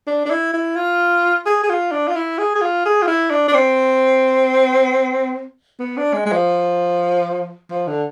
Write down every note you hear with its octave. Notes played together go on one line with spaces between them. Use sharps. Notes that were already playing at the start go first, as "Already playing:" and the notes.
D4
D4
E4
E4
F4
G#4
G#4
F4
D4
F4
E4
G#4
G#4
F4
G#4
F4
E4
D4
D4
C4
B3
D4
G#3
G#3
F3
F3
D3